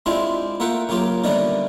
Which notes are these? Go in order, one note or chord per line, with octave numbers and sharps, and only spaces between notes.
G#3 C4 D4 E4 F4 G4
A3 A#3 F4 E5 F#5 G5
C#3 F#3 A#3 F4 G4
D3 D#3 G3 A3 B3 D4